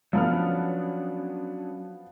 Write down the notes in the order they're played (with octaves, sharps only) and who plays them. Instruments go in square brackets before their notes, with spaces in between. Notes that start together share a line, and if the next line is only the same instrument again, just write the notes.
[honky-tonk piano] F3 B3 F6 [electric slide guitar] F#3 C#4 D4